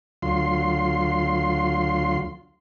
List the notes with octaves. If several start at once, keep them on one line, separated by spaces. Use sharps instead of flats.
D2 F#3 F4 C6